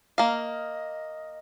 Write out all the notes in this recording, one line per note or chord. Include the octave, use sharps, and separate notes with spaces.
A#3 D#5 F5